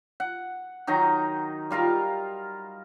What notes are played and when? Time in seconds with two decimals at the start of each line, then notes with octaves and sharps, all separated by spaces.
0.20 F#5
0.87 D#3 F#3 D#4 A#5
1.71 G3 F4 A#4 F5